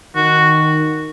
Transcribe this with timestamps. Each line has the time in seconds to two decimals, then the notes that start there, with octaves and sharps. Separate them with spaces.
0.16 D#3 F#4